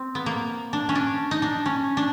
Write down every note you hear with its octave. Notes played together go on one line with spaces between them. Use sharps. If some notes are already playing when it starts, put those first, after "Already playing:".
Already playing: C4
B3
A#3
D4
C#4
D4
D#4
D4
C#4
D4